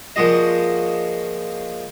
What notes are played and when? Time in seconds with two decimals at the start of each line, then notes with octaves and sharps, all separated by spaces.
0.16 A#2 F3 G#3 F#4 D#5